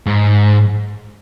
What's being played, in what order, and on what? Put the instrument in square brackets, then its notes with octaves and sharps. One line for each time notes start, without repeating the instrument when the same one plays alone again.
[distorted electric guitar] G#2